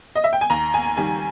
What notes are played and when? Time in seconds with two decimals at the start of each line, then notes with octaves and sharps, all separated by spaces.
0.16 D#5
0.24 E5
0.33 G5
0.41 G#5
0.50 D#2 A#5
0.74 G#5
0.97 D#3 G3 G#5